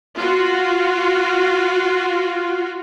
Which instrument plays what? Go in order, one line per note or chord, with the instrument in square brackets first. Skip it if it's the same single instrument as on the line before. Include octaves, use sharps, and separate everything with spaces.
[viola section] F4 F#4